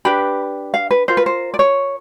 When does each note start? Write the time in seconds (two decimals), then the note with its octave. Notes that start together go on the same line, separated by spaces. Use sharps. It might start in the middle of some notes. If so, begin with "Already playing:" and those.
0.05 D4 G4 B4 B5
0.74 F5
0.91 B4
1.08 F4 A#4 C5
1.17 B4
1.26 C5
1.54 D5
1.59 C#5